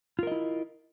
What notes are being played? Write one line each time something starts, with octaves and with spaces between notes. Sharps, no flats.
E4 F4 A#4 D#5